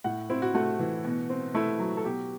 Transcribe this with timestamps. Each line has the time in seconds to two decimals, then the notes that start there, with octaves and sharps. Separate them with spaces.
0.04 A2 F#5
0.30 C4 E4
0.42 F#4
0.54 A3 F#4
0.80 E3
1.05 B2
1.30 C4
1.54 A3 E4
1.79 F#3
1.97 A4
2.04 B2 G4